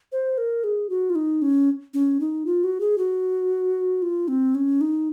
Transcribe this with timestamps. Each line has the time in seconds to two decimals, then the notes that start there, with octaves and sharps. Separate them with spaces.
0.12 C5
0.38 A#4
0.64 G#4
0.90 F#4
1.10 F4
1.15 D#4
1.42 C#4
1.94 C#4
2.20 D#4
2.46 F4
2.64 F#4
2.80 G#4
2.98 F#4
4.02 F4
4.28 C4
4.55 C#4
4.81 D#4